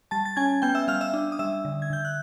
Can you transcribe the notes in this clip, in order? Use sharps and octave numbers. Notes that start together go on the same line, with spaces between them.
G3 A5 A6
A6
C#4 G#5 G#6
B3 G5 G6
E5 E6
G3 F5 F6
E5 E6
D4
D#6
G3 E5 E6
D3
G#6
D3 G6
F#6